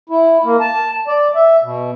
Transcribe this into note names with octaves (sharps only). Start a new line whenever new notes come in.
E4
A#3
A5
D5
E5
B2